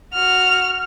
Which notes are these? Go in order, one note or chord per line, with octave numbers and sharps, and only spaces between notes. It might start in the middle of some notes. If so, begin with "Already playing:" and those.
F#4 F6